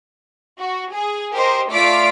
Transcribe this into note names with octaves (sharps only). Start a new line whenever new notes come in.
F#4
G#4
G4 A#4 C5 D#5
A3 F4 D5 D6 B6 D7